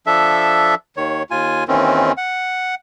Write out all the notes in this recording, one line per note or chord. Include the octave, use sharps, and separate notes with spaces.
F3 D4 A4 E5
D#2 D#3 C#5
D#2 F4 G#5
D#2 D#3 E3 C4 C#4
F#5